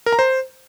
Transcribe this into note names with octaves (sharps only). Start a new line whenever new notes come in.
A#4
A#5
C5